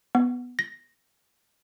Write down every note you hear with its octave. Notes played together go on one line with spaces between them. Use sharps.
B3
A#6